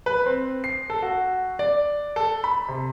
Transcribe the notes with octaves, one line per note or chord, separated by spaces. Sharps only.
B4
C4
C7
A4
F#4
D5
A4
B5
C3